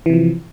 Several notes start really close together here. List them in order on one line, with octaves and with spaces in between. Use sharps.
E3 C3 F3